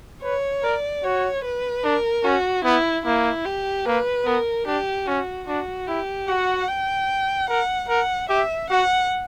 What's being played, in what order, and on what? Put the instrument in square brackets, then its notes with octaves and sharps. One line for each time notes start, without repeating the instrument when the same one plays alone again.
[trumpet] B4 [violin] C#5
[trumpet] A#4 [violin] D5
[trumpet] F#4 [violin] C#5
[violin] B4
[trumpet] D4 [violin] A#4
[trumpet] C#4 [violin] F#4
[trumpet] B3 [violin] E4
[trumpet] A#3 [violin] E4
[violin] G4
[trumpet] A#3 [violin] B4
[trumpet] B3 [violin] A#4
[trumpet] D4 [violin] G4
[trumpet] C#4 [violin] F#4
[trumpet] D4 [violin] F#4
[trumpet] E4 [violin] G4
[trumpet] F#4 [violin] F#5
[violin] G5
[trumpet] A#4 [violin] F#5
[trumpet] A#4 [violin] F#5
[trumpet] G4 [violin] E5
[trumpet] F#4 [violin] F#5